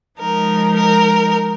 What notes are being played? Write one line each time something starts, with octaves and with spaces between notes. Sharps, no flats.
F3 G#3 D#4 A#4
A#4